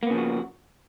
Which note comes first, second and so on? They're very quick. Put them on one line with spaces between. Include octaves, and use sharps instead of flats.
A#3 B3 C#3 F3 F#4